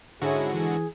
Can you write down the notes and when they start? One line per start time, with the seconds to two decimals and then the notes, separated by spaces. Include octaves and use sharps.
0.22 G#2 D3 C#4 E4 F#4 G#4
0.54 E3 G#4